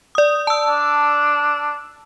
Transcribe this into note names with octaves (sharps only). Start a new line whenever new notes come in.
D5 D#6
A5 E6
D4